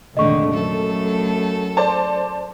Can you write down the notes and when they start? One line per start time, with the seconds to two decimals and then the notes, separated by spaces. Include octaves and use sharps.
0.17 F1 A#1 D3 D#3 G#3 A3 D#5 C#6
0.49 F#2 A3 A4
1.77 C5 D5 A5